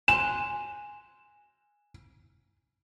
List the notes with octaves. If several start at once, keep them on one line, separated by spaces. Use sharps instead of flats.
G#5 C6 F#6 E7